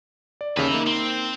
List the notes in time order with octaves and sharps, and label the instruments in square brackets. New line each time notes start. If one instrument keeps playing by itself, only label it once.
[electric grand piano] D5
[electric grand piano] D#2 C#3 [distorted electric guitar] B4 E5
[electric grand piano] A#3 D#4
[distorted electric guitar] C4